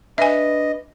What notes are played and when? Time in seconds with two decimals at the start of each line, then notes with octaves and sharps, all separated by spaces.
0.18 D4 B4 D#5 E5 G#5